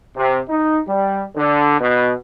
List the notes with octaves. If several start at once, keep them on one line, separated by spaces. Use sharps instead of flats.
C3
D#4
G3
D3
B2